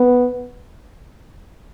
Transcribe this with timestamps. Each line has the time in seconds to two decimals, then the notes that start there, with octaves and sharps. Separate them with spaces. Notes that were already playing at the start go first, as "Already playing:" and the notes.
Already playing: B3